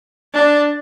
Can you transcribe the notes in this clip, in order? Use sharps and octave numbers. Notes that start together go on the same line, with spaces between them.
D4